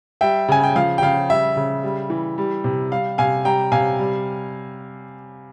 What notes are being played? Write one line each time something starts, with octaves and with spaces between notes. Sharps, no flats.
G3 E5 G5
C#3 G#5
G5
F3 F5
G5
C#3 F5
G3 E5
C#3
G3
E3
G3
C3
G3 F5
C3 F5 G#5
G3 G5 A#5
C3 F5 G#5
G3